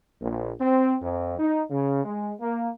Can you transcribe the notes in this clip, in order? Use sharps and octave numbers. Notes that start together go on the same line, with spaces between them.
A#1
C4
F2
D#4
C#3
G#3
A#3